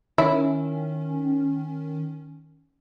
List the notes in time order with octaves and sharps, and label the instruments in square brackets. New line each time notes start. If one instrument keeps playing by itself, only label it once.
[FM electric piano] D#3 C#4 [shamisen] E4